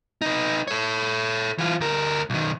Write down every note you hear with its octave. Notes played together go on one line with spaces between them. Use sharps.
D#4 B4
A4 C#5
E3 F4
D2 A#4
B1 D#3